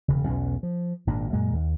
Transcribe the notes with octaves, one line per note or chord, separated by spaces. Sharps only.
E1 C#3
B1 E2 C#4
F3
G#1 A#2 A#3 D4
F#2 A#2 G#3 A#3
D#2